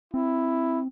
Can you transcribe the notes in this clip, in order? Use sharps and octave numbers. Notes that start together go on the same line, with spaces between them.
C4 E4